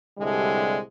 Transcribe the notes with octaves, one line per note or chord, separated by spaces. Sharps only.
C2 A2 D3 G3 G#3